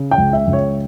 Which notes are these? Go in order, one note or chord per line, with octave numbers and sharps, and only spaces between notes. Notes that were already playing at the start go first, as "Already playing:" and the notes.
Already playing: C#3
G5
C#2
E5
C#2
C#5